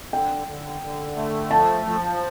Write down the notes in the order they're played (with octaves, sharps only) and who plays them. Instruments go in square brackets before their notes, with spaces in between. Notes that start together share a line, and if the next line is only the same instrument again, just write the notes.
[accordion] D3 [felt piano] G5
[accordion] D3
D3
A3
[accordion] F3 [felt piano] A5
[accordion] F3